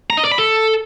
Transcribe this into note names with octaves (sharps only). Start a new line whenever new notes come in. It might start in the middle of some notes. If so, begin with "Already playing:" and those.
A#5
D#5
D5
B5
A4